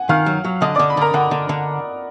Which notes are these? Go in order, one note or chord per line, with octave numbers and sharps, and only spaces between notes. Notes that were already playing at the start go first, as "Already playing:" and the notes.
Already playing: F#5 G#5
D#3 F5 F6
F#3
F#3
D3 D#5 D#6
D3 D5 D6
B5
D3 A#4 A#5
D3 F#5
D3
D3